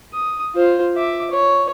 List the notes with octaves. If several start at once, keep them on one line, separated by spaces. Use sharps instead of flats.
D#6
F4 C5
E5 D6
C#5